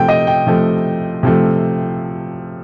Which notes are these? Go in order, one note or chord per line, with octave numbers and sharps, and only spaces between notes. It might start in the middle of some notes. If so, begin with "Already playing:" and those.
Already playing: C3 F3 A3 G5
D#5
G5
C3 F3 A3
C3 F3 A3